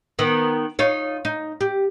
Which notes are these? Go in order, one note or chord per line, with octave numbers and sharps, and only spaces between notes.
D#3 B3
D#4 F4 C#5
D#4
G4